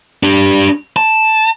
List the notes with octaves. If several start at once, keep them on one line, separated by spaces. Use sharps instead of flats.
D4 G4
A5